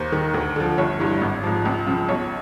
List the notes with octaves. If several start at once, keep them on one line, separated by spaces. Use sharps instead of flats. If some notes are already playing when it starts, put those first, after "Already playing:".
Already playing: D#2 C5
D#3
D2
D3 F3
G1 C#5
G2 E3
G#1
G#2 F3
C#2
C#3 F3
B1 C#5